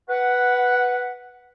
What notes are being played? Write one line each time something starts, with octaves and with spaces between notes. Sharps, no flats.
B4 F#5